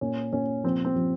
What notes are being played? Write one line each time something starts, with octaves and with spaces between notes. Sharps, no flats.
A#2 C#4
A#2 C#4
F3 C4
C4
F3